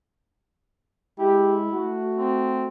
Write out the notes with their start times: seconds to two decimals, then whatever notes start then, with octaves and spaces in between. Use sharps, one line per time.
1.19 G#3 E4 G4
1.73 A3 F#4
2.18 C4